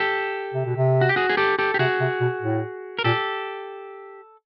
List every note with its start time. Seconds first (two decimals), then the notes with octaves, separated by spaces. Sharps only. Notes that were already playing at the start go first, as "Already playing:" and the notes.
Already playing: G4 A4
0.54 C3
0.65 B2
0.76 C3
1.01 F#4
1.09 G4
1.16 F#4 G#4
1.30 G#4
1.37 G4 A4
1.59 G4 A4
1.74 G4
1.79 C3 F#4 G#4
2.00 C3
2.21 B2
2.42 A2
2.99 A#4
3.04 A#2 G4 A4